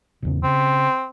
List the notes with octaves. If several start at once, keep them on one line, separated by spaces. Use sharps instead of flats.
G#1 E2 C#3
C#3 C4